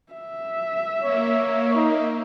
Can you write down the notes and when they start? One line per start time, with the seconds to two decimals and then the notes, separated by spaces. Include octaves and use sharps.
0.12 E5
1.03 A#3 C#5
1.75 D#4